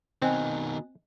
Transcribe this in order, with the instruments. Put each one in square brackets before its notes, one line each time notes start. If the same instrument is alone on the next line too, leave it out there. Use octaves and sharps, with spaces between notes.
[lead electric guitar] B2 D#3 [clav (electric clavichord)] C4 [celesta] D#5 G#5 F#6